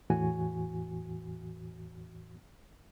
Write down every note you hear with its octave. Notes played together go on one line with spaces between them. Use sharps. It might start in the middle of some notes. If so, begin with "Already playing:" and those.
E2 A2 E3 F#4 G#5